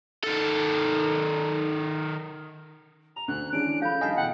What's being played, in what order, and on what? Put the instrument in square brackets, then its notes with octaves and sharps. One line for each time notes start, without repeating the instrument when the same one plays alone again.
[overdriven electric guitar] D#3 A4
[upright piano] A#5 [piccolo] F7
[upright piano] D2 [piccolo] F#6
[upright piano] E3 G#3 [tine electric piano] C#4 D4 [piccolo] D7
[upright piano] F3 A4 [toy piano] F5 B5 [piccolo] G6
[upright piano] G2 D#3 B6 [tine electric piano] D#5 F5 A5 [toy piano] G#5
[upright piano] B2 D3 E3 [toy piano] D4 G5 [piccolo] F#5